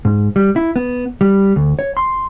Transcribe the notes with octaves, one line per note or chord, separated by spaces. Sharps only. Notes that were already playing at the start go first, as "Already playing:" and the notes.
G#2
G3
E4
B3
G3
D2
C#5
C6